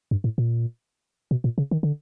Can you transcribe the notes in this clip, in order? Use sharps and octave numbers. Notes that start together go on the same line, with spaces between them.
G2
A2
A#2
B2
A#2
C#3
D#3
D3